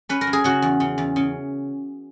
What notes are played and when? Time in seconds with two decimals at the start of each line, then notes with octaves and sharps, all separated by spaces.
0.09 C#4 B4
0.21 A#4
0.27 F#3
0.33 G#4
0.44 C#3 F#4
0.62 E2
0.80 C#3
0.98 E2
1.16 C#3